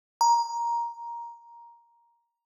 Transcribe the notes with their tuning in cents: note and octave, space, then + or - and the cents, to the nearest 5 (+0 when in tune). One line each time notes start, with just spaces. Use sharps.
A#5 +10